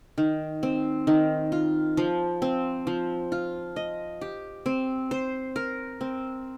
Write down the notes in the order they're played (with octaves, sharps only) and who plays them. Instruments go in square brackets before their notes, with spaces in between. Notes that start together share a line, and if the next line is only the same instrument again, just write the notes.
[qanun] D#3
C4
D#3
F4
F3
C4
F3
F4
D#5
G4
C4
C5
A#4
C4